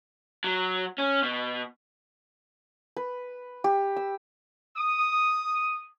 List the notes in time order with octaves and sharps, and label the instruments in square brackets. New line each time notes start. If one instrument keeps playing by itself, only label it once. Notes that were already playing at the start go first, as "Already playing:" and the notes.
[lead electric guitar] F#3
C#4
B2
[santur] B4
G4
E6
[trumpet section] D#6